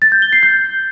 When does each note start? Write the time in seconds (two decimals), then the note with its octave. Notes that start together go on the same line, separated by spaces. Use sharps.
0.02 A6
0.12 G6
0.22 G7
0.33 C7
0.43 G6